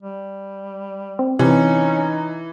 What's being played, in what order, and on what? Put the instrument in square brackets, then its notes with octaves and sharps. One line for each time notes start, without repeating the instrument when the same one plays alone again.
[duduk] G3
[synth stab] C4
[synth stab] C3 C4 [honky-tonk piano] E3 [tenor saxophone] C#4 [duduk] D#4